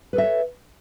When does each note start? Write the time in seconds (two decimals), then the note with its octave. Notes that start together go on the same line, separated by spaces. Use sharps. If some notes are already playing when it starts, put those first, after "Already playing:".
0.13 B4
0.16 A4
0.18 E5
0.21 D#5
0.23 C#5